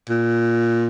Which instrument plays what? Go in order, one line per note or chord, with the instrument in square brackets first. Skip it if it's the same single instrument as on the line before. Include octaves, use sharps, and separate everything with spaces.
[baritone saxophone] A#2